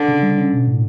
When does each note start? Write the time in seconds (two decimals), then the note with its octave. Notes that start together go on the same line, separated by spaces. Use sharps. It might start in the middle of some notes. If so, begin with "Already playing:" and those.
Already playing: D3
0.08 C#3
0.22 G3
0.38 C#4
0.53 B2
0.68 A2